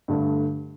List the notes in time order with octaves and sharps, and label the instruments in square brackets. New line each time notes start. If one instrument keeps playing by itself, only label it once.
[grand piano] G2 D3 A3